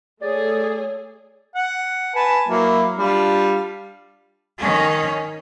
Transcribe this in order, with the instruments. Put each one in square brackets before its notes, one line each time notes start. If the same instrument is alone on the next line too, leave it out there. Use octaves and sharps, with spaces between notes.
[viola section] A3 G#4 A4 [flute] C#5 [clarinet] D5
[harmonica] F#5
B4 G#5 A5
F#3 A#3 E4
G3 D4 F4
[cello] D#3 C#4